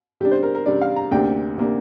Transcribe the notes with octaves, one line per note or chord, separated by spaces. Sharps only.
C3 G3 D4 G4
C5
A#4
A#4
C3 G3 D4 D5
F5
A#5
D2 C3 A#3 D4 G5
C3 A#3 D4